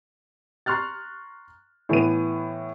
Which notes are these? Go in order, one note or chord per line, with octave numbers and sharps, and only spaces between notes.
A#5 C6 C#6 F6 F#6 A6
A2 E3 B3 D#7